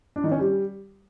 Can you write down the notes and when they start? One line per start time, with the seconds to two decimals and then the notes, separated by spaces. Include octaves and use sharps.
0.16 D4
0.24 D#3
0.31 C#4
0.39 G3